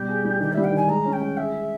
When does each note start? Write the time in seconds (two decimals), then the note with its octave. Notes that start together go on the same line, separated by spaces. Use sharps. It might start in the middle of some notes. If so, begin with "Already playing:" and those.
Already playing: B2 G3 G4
0.08 G#4
0.24 G3
0.40 D#3 G4
0.53 G3 E5
0.64 G5
0.72 D#3 G#5
0.88 G#3 A#5
1.05 C#4
1.13 G5
1.21 G#3
1.37 G#4 E5
1.53 G#4